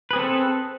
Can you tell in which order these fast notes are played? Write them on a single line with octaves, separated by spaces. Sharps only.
B4 G#4 C4 A4